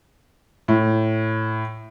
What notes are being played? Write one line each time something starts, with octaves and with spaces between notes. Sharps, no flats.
A2